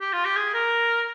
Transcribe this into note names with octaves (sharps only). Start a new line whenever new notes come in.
G4
F4
G4
G#4
A#4